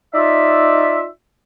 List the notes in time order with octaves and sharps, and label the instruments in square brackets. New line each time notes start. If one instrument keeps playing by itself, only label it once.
[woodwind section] D#4 F4 D5 E5